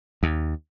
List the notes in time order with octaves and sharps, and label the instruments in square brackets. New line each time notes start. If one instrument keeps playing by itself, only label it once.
[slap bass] D#2